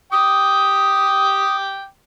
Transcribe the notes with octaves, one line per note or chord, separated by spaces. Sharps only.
G5 D6 D#6